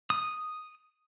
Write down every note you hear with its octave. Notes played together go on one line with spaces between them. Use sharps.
D#6